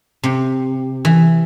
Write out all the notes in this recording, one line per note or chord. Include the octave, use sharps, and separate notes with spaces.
C3
E3